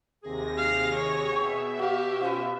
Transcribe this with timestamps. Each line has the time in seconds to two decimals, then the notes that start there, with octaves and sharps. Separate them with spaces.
0.23 D#2 C3 G#4 A#6
0.58 F5
0.95 C#5
1.32 B2 E5 G5 C#6
1.79 F#4 G4 F5
2.21 C#4 F4 B4 C5